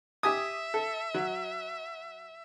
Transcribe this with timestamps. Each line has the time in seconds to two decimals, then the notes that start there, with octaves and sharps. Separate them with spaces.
0.23 G4 E5 G#5 D#6
0.74 A4
1.14 F#3